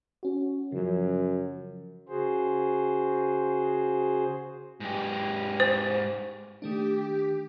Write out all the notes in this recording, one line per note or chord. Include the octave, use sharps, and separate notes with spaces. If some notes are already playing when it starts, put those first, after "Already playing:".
C#4 F#4
F#2 C#3 F3
C#3 F#4 G#4 C5
G#2 G4
C5
D#3 A3 D4 G4